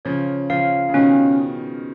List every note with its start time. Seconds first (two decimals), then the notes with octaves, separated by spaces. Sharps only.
0.05 C#3 F3 C#5
0.50 C#3 F3 F5
0.89 C#3
0.94 B2 D#3 C#4